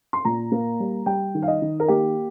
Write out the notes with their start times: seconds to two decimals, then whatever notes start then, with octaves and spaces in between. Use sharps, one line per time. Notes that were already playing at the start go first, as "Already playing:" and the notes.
0.13 C6
0.25 A#2 A#5
0.52 A#3
0.80 G3
1.06 G3 G5
1.35 D#3
1.43 F5
1.48 D#5
1.62 D#3
1.80 A#4
1.88 A#3 G4